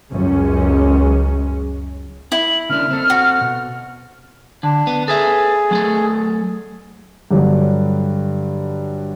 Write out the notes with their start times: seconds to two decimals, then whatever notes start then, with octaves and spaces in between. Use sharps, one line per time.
0.11 C#2 F#2 G#3 C#4
2.32 E4 F#7
2.70 C#3 A#3 D4 F6
2.91 C4 A4
3.10 F#4
3.41 B2
4.63 D3 D4
4.87 B3
5.08 G#4 A4 B4 E5
5.71 F#3 A3 A4
7.31 G2 D3 F#3